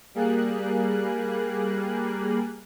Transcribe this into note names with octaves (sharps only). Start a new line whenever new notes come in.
G3 A#3 G#4 F#6